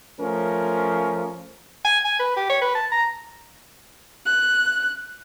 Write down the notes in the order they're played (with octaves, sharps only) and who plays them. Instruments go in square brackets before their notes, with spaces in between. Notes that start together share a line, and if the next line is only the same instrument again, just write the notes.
[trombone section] F3 A3 C#4 A#4
[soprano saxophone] G#5
G#5
B4
G4
C#5
B4
A5
A#5
[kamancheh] F#6